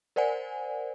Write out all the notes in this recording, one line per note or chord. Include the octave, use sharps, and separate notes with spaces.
A#4 C5 D5 F#5 G#5